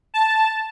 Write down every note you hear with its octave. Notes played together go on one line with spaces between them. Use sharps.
A5